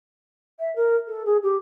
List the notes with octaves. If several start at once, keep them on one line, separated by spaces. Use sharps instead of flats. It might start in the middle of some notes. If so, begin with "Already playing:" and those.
E5
A#4
A4
G#4
G4